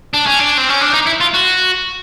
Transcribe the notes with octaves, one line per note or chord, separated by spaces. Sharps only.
D4
C#4
D4
C4
C#4
D4
D#4
E4
F4
F#4